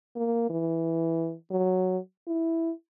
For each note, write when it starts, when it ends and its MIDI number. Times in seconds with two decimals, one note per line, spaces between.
0.16 0.46 58
0.50 1.34 52
1.51 1.98 54
2.27 2.72 64